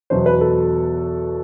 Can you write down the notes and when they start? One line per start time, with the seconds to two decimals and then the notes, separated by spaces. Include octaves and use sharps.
0.10 E2 B2 F#3 C5
0.26 B4
0.41 A4